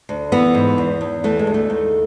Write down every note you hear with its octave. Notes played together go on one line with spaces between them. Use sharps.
D2
E3 B3
G#2
E2
E2
E3 A3
G#3
D2
A3
D#2